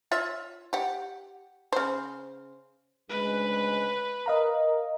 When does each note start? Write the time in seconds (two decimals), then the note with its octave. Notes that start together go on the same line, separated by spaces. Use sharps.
0.11 F4 C#5 E5
0.73 G4 F#5
1.73 C#3 C5
3.09 D2 C#3 G#3 B4
4.26 A#4 D#5 F5 A#5